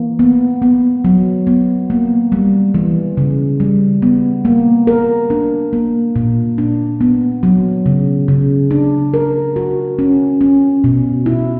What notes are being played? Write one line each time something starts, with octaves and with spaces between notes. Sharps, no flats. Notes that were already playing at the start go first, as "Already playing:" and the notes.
Already playing: E3 A#3
B3
B3
F#3
B3
A#3
G3
E3
C#3
G3
B3
A#3
A#4
D4
A#3
A#2
D4
B3
F#3
C#3
C#3
D4
A#4
F#4
C#4
C#4
B2
E4